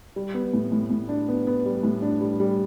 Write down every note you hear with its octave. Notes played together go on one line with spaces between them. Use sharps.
G3
B3
A2
A2
A2
D4
B3
B3
G3
A2
D4
G3
G3